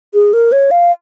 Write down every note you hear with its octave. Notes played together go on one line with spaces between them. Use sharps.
G#4
A#4
C#5
F5